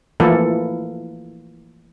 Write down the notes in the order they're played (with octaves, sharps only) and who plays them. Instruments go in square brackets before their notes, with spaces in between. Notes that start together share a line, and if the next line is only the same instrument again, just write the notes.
[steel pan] E3 F3 A3 A#3 E4 A4